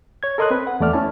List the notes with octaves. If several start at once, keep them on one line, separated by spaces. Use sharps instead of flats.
C#5 G#6
A4 A#4 D#5 C6 D#6 F#6
C4 B4
F#5
E2 A3 D5 F6
C#4 E4 A5